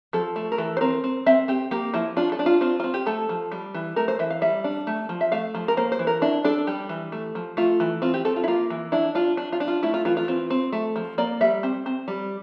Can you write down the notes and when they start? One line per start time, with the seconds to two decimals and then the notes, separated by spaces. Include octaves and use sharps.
0.13 F3 A4
0.36 A3
0.52 A#4
0.58 E3 A4
0.77 C5
0.81 C4 A#4
1.04 C4
1.26 C4 E5
1.48 C4 G4
1.71 A#3 G4
1.94 F3 E4
2.16 D4 F4
2.32 A4
2.39 D4
2.46 F4
2.61 C4 F4
2.80 C4 F4
2.94 G4
3.06 A3 A4
3.29 F3
3.52 G3
3.74 E3
3.96 A3 A#4
4.08 C5
4.19 E3 E5
4.30 F5
4.42 G3 E5
4.64 D4
4.87 A3
5.09 F3
5.21 E5
5.32 A3 F5
5.55 F3
5.68 A#4
5.77 A#3 C5
5.92 C5
5.99 E3
6.07 A#4
6.22 D4 E4
6.44 D4 A4
6.67 G3 G4
6.89 E3
7.12 A3
7.35 F3
7.57 A3 F4
7.80 E3
8.02 C4 F4
8.14 G4
8.25 C4 A4
8.36 F4
8.44 E4
8.48 A#3 F4
8.70 E3
8.92 D4 E4
9.15 D4 F4
9.37 D4
9.52 F4
9.60 D4
9.68 F4
9.83 A3 E4
9.94 F4
10.05 E3 F4
10.17 F4
10.28 C4
10.50 C4
10.72 A3
10.96 F3
11.18 A#3 D5
11.41 G3 E5
11.63 C4
11.86 C4
12.08 G3